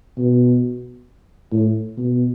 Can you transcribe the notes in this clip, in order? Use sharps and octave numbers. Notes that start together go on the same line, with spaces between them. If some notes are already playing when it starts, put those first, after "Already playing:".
B2
A2
B2